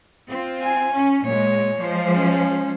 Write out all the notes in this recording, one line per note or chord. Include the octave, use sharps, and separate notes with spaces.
C4 F4
G#5
C#4
A#2 G#3 C#5
F3 G#3 C5
C#4